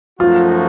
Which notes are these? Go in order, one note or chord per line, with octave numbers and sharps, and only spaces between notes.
F#2 F3 A3 D#4 F4 F#4